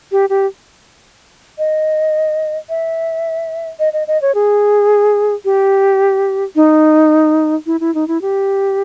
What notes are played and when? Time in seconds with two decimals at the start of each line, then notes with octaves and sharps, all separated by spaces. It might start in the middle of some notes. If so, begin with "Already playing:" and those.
0.12 G4
0.30 G4
1.58 D#5
2.69 E5
3.79 D#5
3.93 D#5
4.07 D#5
4.22 C#5
4.35 G#4
5.45 G4
6.55 D#4
7.66 E4
7.80 E4
7.95 D#4
8.08 E4
8.21 G4